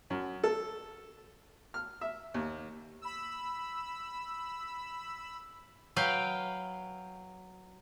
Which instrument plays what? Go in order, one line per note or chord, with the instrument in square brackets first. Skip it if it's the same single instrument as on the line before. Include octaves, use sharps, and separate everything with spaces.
[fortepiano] F#2
A4
F6
E5
D#2
[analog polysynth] B5 E6
[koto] F#3 B4 F5 G5